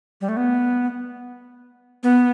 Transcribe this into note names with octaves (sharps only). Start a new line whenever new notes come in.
G3
A3
B3
B3